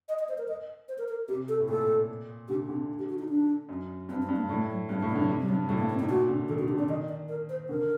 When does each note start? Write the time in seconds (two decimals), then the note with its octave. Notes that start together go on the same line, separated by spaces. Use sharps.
0.09 D#5
0.19 D#5
0.29 C5
0.38 A#4
0.48 D#5
0.89 C5
0.98 A#4
1.08 A#4
1.28 C3 G4
1.48 A4
1.60 A2
1.68 A#2 A4
2.48 D3 G4
2.69 D3 C4
2.98 G4
3.09 F#4
3.19 D#4
3.29 D4
3.69 F#2
4.09 G2 C4
4.22 C4
4.29 G2
4.36 A#3
4.49 A2 A3
4.69 F#3
4.89 G2 G3
4.99 A3
5.02 A2
5.09 A#3
5.15 D3 F#3
5.29 C3
5.40 G3
5.49 G2 F#3
5.68 A2 G3
5.78 A#3
5.89 C4
5.99 A2 D#4
6.09 A#2 F#4
6.29 D3
6.48 D#3 A4
6.59 F#4
6.62 D3
6.68 G4
6.76 D3 D5
6.89 D#3 D#5
7.08 D5
7.29 A#4
7.49 C5
7.69 D3 A#4